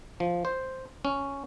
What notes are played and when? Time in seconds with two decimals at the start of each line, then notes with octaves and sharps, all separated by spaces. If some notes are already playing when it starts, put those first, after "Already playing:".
0.20 F3
0.45 C5
1.05 C#4